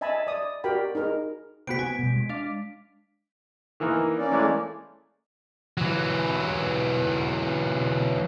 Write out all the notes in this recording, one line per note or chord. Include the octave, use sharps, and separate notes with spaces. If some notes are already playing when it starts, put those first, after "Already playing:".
D#5 E5 G#5 A5 B5
D5 D#6
F#4 G4 A#4 D5 G5 B5
D#4 G#4 A#4
C3 B3 F#4 B6 D7
B3 G#5
B2 G3
G#3
D4 F5
D#3 E3 A#3
A#3 C#4 D5
E3 G#3 A3
E3 F#3